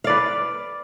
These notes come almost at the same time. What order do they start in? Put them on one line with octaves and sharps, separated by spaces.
F5 D5 B4